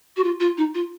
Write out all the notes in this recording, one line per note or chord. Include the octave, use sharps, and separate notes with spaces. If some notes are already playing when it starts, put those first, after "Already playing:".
F#4
F4
F4
D#4
F4